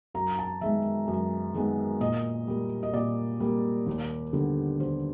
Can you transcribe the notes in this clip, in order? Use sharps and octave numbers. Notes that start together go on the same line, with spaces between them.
F#2 A#5
A5
D#3 G#3 B3 E5
F#2
D#3 G#3 B3
A#2 D#5
G3 A#3
D#5
A#2 D5
G3 A#3
D#2
D3 G3 B3
D#2 C5